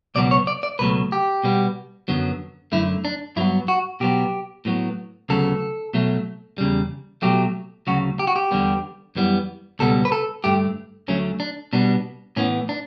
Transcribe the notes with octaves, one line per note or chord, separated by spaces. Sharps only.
C#2 B2 F#3 B3 D5
C#5
D5
D5
C#2 B2 F#3 A3 B4
G4
B2 G3 B3
F#2 D3 F#3 B3
F#2 D3 A3 E4
D4
G2 F#3 B3 E4
F#4
B2 F#3 B3 G4
A2 F#3 B3
D2 C#3 F#3 B3 A4
B2 F#3 A3
E2 C#3 G3
B2 F#3 A3 G4
D2 C#3 F#3 F#4
G4
F#4
G4
E2 D3 G3 B3
F#2 E3 G3 B3
C#2 B2 G3 B3 A4
B4
A4
G2 D3 A3 G4
D2 D3 F#3 A3 C#4
D4
B2 G3 B3 D4
A2 E3 B3 C#4
D4